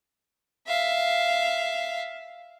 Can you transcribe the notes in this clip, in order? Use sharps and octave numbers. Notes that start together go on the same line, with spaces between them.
E5 F5